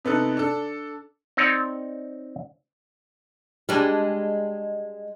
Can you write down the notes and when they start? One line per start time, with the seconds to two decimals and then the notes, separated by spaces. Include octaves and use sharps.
0.05 C3 B3 D#4 A4
0.37 D4 A4
1.37 C4 D#4 C#5 D5
3.69 G3 G#3 D4